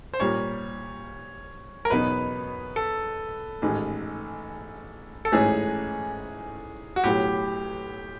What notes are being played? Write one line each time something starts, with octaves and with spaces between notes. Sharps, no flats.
C5
A#2 G3 A#3 C#5
A#4
E2 B2 F#3 B3 D#4 B4
A4
A1 G#2 D#3
A4
A1 G#2 E3 A3 C#4 G#4
F#4
B1 A2 F#3 G4